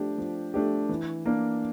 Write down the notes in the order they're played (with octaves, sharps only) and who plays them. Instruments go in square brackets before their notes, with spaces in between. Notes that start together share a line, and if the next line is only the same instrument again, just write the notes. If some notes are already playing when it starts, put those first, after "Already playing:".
Already playing: [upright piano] F3 A3 D4 G4
F3
A3 D4 G4
E3
A#3 D4